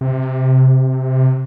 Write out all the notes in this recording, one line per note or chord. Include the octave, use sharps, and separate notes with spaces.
C3